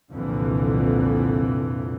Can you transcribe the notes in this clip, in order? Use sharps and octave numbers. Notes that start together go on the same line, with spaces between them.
C2 F2 A#2 D3 E3